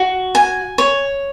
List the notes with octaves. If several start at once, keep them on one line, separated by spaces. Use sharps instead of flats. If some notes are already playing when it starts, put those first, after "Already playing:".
Already playing: F#4
G#5
C#5